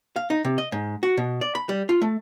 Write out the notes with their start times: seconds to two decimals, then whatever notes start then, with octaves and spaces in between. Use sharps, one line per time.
0.16 F5
0.30 D#4
0.45 C3
0.58 D#5
0.72 G#2
1.03 F#4
1.17 B2
1.41 D5
1.55 B5
1.69 G3
1.89 F4
2.02 A3